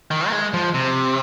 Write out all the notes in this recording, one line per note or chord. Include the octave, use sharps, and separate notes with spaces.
D#3
A#3
G#3
F3
C3